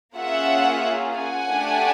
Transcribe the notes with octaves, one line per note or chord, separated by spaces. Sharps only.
A#3 C#4 F4 G#4 E5 F#5
F#5 G#5
A3 D4 G4